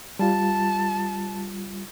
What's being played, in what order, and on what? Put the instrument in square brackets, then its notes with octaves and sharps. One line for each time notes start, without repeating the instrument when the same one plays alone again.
[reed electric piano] G3 F4 [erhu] A5